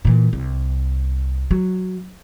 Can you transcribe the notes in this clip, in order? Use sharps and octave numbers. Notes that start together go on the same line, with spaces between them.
A#2 E3
C2
F#3